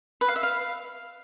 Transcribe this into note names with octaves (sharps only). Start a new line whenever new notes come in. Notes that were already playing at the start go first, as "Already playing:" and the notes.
B4
F5
E5
F5